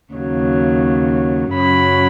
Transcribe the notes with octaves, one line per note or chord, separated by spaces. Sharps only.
D#2 C#3 F#3
F#2 C#3 F#3 B5